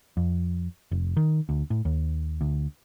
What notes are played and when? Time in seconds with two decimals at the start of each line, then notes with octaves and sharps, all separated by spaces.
0.17 F2
0.91 F1
1.17 D#3
1.49 D2
1.70 A2
1.85 D#2
2.41 D2